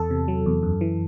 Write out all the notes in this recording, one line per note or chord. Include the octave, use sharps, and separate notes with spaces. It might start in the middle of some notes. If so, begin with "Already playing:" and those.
Already playing: E2 A4
C3
F#3
E2
F#2
E3